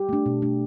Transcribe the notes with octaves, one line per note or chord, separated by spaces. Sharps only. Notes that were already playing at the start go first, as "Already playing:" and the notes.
Already playing: G4
A3 D4
B2
A3 D4